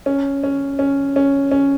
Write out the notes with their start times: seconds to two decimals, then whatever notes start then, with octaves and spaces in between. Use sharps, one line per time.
0.06 C#4
0.44 C#4
0.79 C#4
1.16 C#4
1.51 C#4